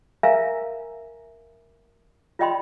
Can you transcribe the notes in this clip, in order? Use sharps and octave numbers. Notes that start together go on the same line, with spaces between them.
A#4 E5 F5 G#5 A#5
F4 D5 D#5 G5 B5 C6